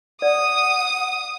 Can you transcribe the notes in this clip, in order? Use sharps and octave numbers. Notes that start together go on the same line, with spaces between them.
D5 F#5 D#6